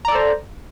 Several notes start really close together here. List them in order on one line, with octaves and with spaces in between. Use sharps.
A#5 D5 A4 C5